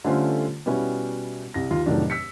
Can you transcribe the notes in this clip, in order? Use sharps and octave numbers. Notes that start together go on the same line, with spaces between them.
D3 G3 A3 C#4 F4 C5
B2 G3 B3 C#4 E4 F#4
C2 A#6
D#2 F4
F1 A2 D#3 F#3 D4
E6 B6 C#7